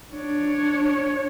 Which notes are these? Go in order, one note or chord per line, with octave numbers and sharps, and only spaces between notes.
D4 C#5